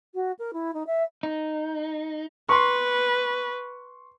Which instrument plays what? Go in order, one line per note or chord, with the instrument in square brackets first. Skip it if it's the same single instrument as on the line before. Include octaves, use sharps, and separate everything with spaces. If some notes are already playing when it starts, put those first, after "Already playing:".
[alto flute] F#4
A#4
E4
D#4
E5
[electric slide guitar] D#4
[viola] B4 [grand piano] C6 C#6